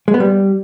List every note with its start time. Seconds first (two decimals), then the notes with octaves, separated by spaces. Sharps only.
0.08 G#3
0.14 B3
0.20 G3